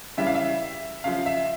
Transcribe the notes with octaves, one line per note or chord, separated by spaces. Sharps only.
C#3 E3 G3 E5
F5
E5
C#3 F3 F5
E5